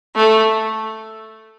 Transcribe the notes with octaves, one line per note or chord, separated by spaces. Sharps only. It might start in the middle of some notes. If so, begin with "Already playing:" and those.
A3